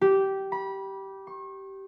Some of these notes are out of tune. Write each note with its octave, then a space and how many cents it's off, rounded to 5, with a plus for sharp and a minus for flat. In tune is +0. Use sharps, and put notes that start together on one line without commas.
G4 -15
B5 -25
C#6 -40